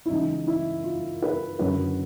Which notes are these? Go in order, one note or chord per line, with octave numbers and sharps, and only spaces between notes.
E4
C#2 C#3 E3 D#4
E4
F4
B4
F#1 F#2 D3 F#3 B4